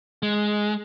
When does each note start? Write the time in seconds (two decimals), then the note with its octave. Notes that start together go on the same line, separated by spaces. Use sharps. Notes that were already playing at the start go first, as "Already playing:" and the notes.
0.23 G#3